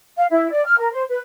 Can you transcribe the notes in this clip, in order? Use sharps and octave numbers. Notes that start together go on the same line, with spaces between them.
F5
E4
D5
F6
A#4
C5
B4